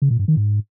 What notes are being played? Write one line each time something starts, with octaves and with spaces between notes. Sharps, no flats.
C#3
A#2
G2
D#3
G#2